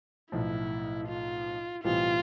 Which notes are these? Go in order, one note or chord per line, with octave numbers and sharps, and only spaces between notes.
B1 A2 F3 E4
F4
B1 A2 E3 G3 C4 F4